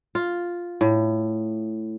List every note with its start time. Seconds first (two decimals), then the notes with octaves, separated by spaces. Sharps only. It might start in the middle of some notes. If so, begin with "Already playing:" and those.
0.15 F4
0.81 A2